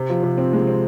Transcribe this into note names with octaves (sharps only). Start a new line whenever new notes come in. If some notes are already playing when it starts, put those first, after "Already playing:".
Already playing: C3
F3
C3
C4
G#3
C4